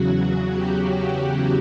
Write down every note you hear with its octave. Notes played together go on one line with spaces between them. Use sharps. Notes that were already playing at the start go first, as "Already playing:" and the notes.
Already playing: E2 C#3 F#3 F#4
G4
G4